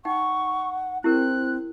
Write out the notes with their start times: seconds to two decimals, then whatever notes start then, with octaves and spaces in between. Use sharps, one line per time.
0.05 D#4 F#5 G5 C#6
1.04 C4 E4 G4 A#4 F#6